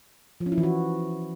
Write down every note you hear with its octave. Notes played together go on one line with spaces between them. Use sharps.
F3
C#4
E4
E3
F#4